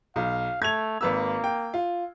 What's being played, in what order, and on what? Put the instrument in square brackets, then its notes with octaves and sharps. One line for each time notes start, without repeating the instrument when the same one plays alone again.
[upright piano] B1 [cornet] F5
[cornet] A3 [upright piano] G#6 F7
[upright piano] G#1 B4 E6 [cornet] A#3
[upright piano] G5
F4